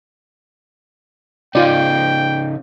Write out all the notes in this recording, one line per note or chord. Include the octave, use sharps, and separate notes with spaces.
C#3 C#4 D#4 F4 D5 G5